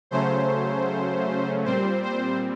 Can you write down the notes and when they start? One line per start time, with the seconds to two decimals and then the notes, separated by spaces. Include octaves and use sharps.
0.11 C#3 F#3 A3 C#4 C5
1.65 A#2 G3 C4 C5
2.03 C5